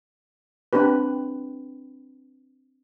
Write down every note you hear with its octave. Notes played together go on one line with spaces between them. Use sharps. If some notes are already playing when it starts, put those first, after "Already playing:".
C4 D4 G4 B4